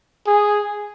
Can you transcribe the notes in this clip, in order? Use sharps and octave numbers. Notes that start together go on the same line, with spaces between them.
G#4